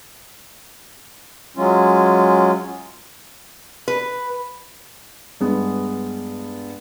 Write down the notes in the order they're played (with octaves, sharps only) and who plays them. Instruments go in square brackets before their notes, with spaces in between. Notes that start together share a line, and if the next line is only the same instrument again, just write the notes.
[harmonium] F#3 G#3 C#4 F4
[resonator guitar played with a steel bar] B4
[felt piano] G2 G#3 B3